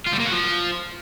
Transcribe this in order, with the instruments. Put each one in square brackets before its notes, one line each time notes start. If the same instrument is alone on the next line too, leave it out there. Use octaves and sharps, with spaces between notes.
[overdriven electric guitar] F4
G3
A#3
F#4
F3